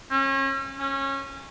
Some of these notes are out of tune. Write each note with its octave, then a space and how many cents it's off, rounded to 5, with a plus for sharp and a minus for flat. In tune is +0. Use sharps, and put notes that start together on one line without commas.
C#4 -35
C#4 -20